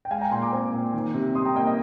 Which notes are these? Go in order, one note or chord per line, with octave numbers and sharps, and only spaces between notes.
G5
G#3 F5 G#5
G5 A#5
A#2 G#5 C6
A#5 D6
C4
A#2
D#3
C3
G3 C6 D#6
G5 A#5
A#3 D#5 G5
D#5